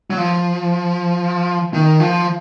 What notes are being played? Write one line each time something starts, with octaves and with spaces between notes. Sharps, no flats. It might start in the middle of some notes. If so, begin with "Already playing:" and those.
F#3
F3
D#3
F3